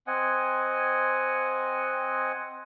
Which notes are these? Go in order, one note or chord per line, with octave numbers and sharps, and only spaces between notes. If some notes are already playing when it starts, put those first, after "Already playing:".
C4 D#5 F#5 G#5